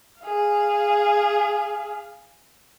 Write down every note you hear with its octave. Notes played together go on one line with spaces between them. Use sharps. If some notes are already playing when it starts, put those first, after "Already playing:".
G#4 F5